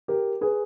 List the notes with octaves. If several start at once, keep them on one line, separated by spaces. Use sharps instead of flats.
G4 A#4
G#4 B4